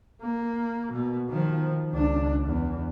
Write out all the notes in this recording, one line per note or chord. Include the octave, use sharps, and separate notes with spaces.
A#3
B2
D#3 F3
C#2 D4
E2